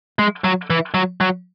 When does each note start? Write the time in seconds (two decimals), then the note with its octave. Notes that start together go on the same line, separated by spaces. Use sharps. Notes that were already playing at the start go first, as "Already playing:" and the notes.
0.19 G#3
0.44 F#3
0.70 E3
0.94 F#3
1.21 F#3